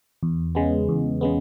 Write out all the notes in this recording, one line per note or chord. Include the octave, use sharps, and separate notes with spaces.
E2
C#3 G#3 B3
E2
C#3 G#3 B3